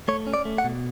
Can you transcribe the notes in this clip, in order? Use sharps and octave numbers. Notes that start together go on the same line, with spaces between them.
A3 C#5
C#4
D5
A3
F#5
B2